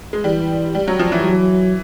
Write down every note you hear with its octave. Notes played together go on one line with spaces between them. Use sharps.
G#3
E3 G3
G3
F#3
F3
E3
F#3